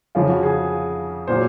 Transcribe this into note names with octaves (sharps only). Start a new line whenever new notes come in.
F2 C#3 F3 F4
F#4
G#4
A#2 F#3 C5